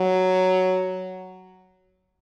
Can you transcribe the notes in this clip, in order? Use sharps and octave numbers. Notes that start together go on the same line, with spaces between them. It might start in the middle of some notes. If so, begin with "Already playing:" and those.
Already playing: F#3